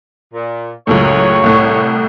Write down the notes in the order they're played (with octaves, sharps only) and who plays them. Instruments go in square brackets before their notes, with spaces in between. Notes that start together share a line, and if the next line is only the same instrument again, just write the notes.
[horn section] A#2
[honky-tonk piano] C#2 F#2 A2 [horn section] C#5
[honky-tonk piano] C2 A2